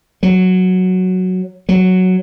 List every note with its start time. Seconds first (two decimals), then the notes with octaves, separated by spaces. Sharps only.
0.23 F#3
1.69 F#3